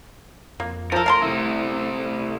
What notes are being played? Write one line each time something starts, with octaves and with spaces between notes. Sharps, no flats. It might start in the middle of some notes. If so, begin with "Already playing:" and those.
F2 A#3
F3 A4 A#4
A3 F5 A5 C6
C3 E4